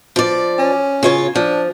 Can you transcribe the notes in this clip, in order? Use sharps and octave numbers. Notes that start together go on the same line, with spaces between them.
F3 D5
C#4
C#3 F4 C#5
F3 D4